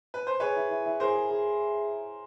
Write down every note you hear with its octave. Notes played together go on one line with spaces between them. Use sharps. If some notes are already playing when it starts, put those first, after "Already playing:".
B4
C5
G#4 B4 C#5
E4
E4
E4
G#4 A#4 C5
G#4
G#4